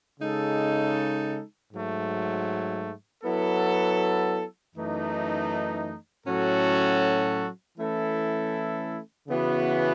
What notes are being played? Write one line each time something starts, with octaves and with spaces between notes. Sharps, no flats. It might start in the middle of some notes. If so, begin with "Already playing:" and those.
C#3 G#3 D#4 A4
G#2 F#3 A3
F#3 B3 E4 A4
F#2 E3 A3 D#4
A2 F#3 C#4 F#4 A4
E3 A3 C#4 E4 A4
C#3 E3 B3 F#4